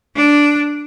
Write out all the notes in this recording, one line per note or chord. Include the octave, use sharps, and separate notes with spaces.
D4